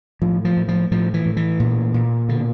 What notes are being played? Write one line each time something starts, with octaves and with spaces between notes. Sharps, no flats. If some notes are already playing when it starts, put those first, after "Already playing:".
A2 F3
F3
A2
F3
A2 F3
E3
A2
E3
A#2
A#2
B2 D3